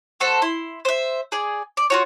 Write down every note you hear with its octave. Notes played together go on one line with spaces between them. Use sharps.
A3 F#4 A4 C5
E4 C6
C5 E5
G#4 D5
D5
F4 F#4 C#5